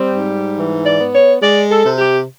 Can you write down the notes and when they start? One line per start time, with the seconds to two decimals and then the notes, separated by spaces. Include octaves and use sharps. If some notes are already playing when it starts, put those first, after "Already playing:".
Already playing: G3 C4
0.14 G#2
0.57 E3
0.85 D5
0.99 B3
1.14 C#5
1.41 G#3 D5
1.70 A4
1.84 C3
1.98 G4